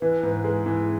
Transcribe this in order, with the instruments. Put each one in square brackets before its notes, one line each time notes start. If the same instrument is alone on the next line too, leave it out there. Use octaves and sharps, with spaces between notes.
[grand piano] E3 [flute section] B4
[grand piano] G#2
G#3
E3